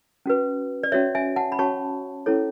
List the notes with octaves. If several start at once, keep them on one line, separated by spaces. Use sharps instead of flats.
C#4 F#4 B4
D5
C#4 F#4 C#5 E5
E5 G#5
F#5 A5
B5
C#4 F#4 C#5 A5 C#6
C#4 E4 A4 C#5